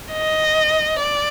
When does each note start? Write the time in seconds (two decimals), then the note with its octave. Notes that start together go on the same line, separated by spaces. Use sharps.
0.12 D#5
0.99 D5